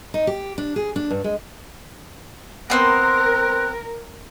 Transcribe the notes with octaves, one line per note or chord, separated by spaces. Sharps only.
D#4
G4
D4
G#4
D4
G2
G#3
B3 C4 A#4 C5 F#6